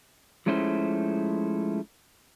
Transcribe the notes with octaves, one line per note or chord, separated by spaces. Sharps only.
F3 G#3 A3 C#4 E4 C5